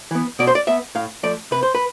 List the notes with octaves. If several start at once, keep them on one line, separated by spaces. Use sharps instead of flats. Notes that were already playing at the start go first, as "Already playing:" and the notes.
E3 B3
B2 D5
C5
D5
B3 E5
A2 F5
F3 A3 D5
C3 B4
C5
B4